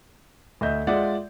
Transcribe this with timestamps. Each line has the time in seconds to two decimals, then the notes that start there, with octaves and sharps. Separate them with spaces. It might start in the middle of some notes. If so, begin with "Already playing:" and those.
0.61 D2 D#5 E5 G6
0.87 G#3 F4 D5 E5 F#5